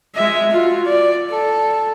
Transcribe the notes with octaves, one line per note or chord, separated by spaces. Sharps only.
G#3 E5
F4 F#4
D5
A4